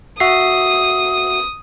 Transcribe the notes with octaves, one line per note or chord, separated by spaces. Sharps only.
F#4 E5 D#6 C7